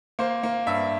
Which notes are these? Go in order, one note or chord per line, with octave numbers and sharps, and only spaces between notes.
A#3 C5
A#3
G2 E5